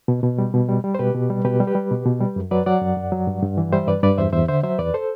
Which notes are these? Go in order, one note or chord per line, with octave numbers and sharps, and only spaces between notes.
B2
B2
G3
B2
G3
G3
C5
B2 G4 B4
B2
G3
B2 G4 B4
G3
G4 B4
G3
B2
B2
G3
F#2
F#3 B4 D5
F#3 D5 F#5
F#2
F#2
F#3
G2
G2
E3
G3 C5 E5
G2 B4 D5
G2 B4 D5
E2 C5 E5
E2 C5 E5
D3 C5 E5
F#3 C5 E5
E2 B4 D5
A4 C5